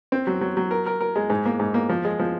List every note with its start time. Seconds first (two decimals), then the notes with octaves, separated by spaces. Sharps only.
0.12 C4
0.27 F#3
0.41 F#3
0.57 F#3
0.71 A#4
0.86 A#4
1.01 A#4
1.16 G#3
1.30 G#2
1.45 A#3
1.60 G#2
1.74 A#3
1.89 F3
2.05 G#3
2.19 F3